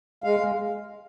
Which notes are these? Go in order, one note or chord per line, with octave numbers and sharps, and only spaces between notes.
G#3 F5
G#3